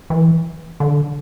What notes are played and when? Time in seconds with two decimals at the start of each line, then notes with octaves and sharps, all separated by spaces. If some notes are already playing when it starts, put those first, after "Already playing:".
0.10 E3
0.80 D3